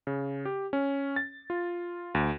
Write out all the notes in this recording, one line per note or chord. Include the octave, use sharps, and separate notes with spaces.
C#3
G4
C#4
A6
F4
D2